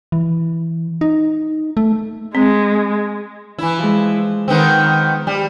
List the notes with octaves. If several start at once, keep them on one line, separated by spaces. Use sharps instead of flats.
E3
D#4
A3
G#3 C4
E3 E4
F3 G#3
D#3 B3 C4
G3